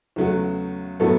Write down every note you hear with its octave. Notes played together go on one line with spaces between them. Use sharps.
E2 C#3 F#3 A3 F#4
A2 F#3 B3 F#4 A4